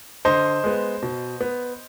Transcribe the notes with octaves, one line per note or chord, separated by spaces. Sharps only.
D3 C5 D#5
G#3 B3
B2
B3